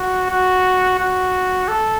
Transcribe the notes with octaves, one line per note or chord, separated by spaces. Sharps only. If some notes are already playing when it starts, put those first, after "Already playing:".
Already playing: F#4
F#4
F#4
A4